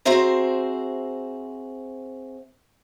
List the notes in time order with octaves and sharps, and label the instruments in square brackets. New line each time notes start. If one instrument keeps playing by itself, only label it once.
[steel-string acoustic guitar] C4 F#4 G#4 C5 E5 A#5